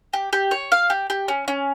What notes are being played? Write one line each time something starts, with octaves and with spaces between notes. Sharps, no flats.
G4
G4
C#5
F5
G4
G4
C#4
C#4